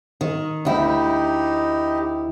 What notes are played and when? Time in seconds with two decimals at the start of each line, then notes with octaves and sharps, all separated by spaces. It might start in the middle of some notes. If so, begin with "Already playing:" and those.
0.21 D#3
0.65 D2 D#4 E4 G4